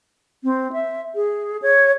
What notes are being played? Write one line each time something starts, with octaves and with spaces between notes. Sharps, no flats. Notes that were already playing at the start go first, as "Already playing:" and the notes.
C4
E5
G#4
C#5